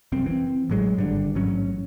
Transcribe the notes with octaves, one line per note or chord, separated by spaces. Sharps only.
F#1 C2 F#2 C4
E3 C4
A1 A2 F#3 G#3
G#1 G2 D3
A1 G#2 F#3 C#4